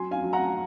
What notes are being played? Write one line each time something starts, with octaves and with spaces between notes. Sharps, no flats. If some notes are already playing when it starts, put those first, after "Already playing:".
Already playing: F#3 G#5 C6
F5 G#5
F#3
F#5 A#5